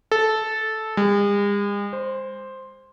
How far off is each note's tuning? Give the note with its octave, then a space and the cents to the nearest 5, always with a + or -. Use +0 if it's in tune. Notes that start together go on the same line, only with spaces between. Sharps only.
A4 -10
G#3 -45
C5 +5